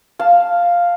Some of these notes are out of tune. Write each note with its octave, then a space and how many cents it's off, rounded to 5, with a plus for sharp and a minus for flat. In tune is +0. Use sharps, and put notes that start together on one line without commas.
F5 +0 A5 +0